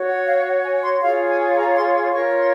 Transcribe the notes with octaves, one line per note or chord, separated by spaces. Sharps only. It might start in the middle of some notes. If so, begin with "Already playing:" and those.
Already playing: F#4 C#5
F#5
F5
F#5
G#5
C6
F4 G#4 C#5 F5
G#5
A#5
C6
C6
F4 A#4 C#5 C#6
C6